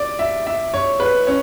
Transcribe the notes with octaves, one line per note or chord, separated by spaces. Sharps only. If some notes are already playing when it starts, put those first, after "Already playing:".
Already playing: D5
E5
E5
C#5
B4
C#4